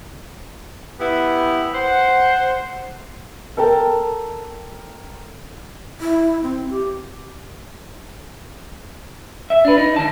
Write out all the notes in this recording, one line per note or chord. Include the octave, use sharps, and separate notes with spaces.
B3 E4 G4 B4
C5 F#5
A4 A#4 G5 A5
E4
C4
G4
E5
D4 B4
D#4
D#3 A5